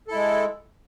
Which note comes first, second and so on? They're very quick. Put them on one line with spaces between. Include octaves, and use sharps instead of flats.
A4 E4 G#3